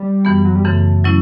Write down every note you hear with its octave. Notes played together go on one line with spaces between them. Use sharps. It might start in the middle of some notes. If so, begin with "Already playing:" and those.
Already playing: G3
F#2 E3 B3
F#3
G3
F#2 C#3 E3 A3
F#3 C#4 E4